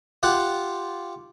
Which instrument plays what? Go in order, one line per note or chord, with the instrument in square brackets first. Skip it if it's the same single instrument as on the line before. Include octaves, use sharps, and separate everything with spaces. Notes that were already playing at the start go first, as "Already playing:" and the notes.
[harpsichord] F4 G4 F#5